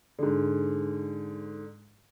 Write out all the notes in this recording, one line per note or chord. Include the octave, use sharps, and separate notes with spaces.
G#2 D3